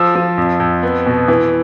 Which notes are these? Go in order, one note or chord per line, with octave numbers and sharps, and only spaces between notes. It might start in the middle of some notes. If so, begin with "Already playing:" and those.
Already playing: F3 E6
F3
F2
F2
B3
B2
E3